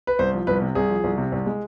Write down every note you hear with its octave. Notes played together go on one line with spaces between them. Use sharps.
B4
C2 C5
F3
C2 B4
C3
C2 G#4
F3
C2
C3
C2
G#3